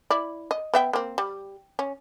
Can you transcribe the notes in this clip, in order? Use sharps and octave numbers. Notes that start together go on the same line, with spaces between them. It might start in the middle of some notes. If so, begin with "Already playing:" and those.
E4 D5
D#5
B3 E5 G5
A#3 C4
G3
C#4